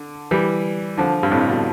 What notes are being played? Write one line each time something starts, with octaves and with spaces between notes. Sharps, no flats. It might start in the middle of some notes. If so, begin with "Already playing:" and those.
Already playing: D3
E3 G3
D3 F3
G2
F2 A2
B2